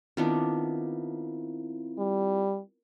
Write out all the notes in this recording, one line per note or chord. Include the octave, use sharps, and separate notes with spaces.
D#3 B3 C4 D4 E4 F4
G3